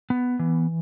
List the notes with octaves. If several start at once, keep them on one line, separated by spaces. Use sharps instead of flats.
B3
E3